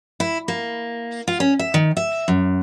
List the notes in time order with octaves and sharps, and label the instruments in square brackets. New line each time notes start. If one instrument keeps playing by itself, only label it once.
[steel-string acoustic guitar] E4
A#3
F4
C#4
E5
D#3
E5
F#2